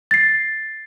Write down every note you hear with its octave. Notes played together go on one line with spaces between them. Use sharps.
A6 C7